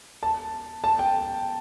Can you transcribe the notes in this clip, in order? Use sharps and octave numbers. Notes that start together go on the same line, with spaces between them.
A5
A5
G5